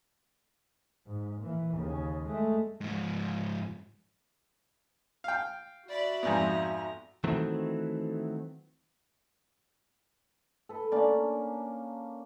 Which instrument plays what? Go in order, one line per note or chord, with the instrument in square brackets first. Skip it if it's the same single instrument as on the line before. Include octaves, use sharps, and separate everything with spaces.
[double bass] G#2
A#2 E3
D#2 C#3
G#3 A3
[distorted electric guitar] G#2 F3
[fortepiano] F5 G5
[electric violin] F#4 E5 [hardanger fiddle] D5 B5
[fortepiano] F2 G#2 B3 [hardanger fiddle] A#5
[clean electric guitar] D#3 E3 F#3 A3 C4
[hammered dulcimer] A4 B4
[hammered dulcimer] A#3 C#4 D4 [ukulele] D5